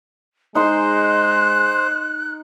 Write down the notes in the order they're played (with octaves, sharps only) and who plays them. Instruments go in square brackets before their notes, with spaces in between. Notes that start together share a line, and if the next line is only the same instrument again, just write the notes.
[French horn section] G#3 [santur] D#4 C6 [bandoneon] C5 [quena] F#6